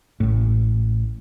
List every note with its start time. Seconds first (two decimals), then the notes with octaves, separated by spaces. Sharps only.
0.20 A1 A2